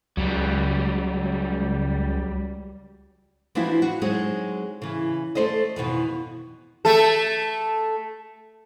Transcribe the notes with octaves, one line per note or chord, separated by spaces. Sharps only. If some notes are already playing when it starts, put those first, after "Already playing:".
C#2 F#3 G3
E3 F3 C4 D4 E4 F#4
F#4
F#3 G#3 C4 D#4 G#4
C#3 E3
A3 A4 C5 D5 D#5
F2 B2 D#3 E3
A3 A4